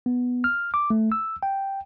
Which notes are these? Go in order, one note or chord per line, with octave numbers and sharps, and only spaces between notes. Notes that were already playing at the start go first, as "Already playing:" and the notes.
B3
F6
D6
A3
E6
G5